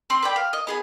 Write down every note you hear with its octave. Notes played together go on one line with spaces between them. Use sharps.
C4 C6
B4 D5 G5
F5
D#5
B3 G#4 G#5